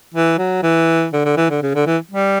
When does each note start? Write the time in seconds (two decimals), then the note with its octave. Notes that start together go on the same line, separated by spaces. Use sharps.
0.14 E3
0.38 F#3
0.63 E3
1.13 D3
1.25 D3
1.37 E3
1.50 D3
1.62 C#3
1.75 D3
1.86 E3
2.11 G3